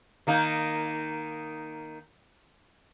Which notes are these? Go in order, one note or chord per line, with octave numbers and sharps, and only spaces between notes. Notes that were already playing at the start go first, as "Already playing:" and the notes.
D#3 A#3 D#4